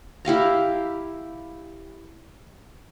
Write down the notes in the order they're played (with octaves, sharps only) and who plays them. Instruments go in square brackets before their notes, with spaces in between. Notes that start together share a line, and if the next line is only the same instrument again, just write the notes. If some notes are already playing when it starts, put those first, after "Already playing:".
[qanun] E4 G4 F5 A#5